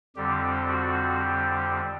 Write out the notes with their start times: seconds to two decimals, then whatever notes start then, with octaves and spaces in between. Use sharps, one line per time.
0.16 F2 D3 G3 C4 G4
0.68 F#4
1.19 G4